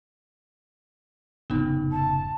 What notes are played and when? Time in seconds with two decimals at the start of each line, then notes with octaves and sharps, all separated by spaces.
1.50 F1 G#2 C#3 B3 D#4
1.92 A5